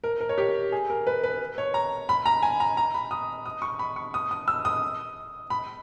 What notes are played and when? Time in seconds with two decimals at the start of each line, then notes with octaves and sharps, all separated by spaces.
0.04 A#4
0.21 A#4
0.29 C#5
0.38 G4
0.72 G#4
0.90 A#4
1.07 B4
1.23 B4
1.58 C#5
1.74 A#5
2.09 B5
2.26 A#5
2.43 G#5
2.60 A#5
2.77 A#5
2.94 B5
3.11 D#6
3.45 D#6
3.62 C#6
3.79 B5
3.96 C#6
4.14 D#6
4.31 D#6
4.48 E6
4.65 D#6
5.50 B5